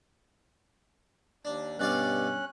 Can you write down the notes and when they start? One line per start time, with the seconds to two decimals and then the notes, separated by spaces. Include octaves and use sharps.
1.45 D#2 D4
1.79 G2 B2 C#4 D5 F5 F#6